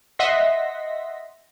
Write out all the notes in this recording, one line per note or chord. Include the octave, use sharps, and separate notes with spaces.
D#5 E5 F#5 C6 A#6 B6